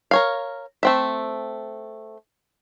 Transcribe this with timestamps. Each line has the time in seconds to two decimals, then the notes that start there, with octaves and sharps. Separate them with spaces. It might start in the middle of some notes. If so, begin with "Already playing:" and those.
0.11 A#4 C#5 F5
0.83 A3 C4 E5